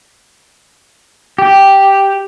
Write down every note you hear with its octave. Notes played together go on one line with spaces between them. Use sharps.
G4